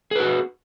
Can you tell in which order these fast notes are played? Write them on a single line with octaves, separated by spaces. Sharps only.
G#4 B4 F#4